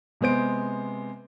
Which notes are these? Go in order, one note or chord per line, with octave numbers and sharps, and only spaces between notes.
C3 G#3 B3 C5 D7